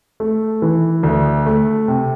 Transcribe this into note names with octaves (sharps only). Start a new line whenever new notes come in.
A3
E3
D2
A3
C3